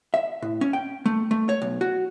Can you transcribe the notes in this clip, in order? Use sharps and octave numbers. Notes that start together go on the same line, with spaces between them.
E5
A2
C#4
G5
A3
A3
C#5
B1
F#4